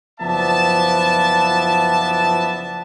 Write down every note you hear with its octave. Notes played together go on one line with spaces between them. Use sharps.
F#1 F3 B3 D5 E5 A5